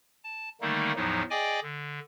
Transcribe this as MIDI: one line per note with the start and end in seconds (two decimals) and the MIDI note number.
0.24 0.49 81
0.61 0.92 50
0.61 0.92 51
0.61 0.92 55
0.61 0.92 57
0.61 0.92 58
0.61 0.92 63
0.96 1.23 40
0.96 1.23 45
0.96 1.23 53
0.96 1.23 54
0.96 1.23 63
1.30 1.60 68
1.30 1.60 74
1.30 1.60 75
1.30 1.60 79
1.30 1.60 80
1.30 1.60 86
1.63 2.00 50